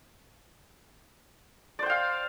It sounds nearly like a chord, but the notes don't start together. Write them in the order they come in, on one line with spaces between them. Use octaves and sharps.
D5 C5 G5 F5